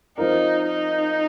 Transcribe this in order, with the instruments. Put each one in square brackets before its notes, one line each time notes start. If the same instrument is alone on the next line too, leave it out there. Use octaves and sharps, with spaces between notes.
[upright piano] F3 C4 F4 A#4 [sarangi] D#4
[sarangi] D#4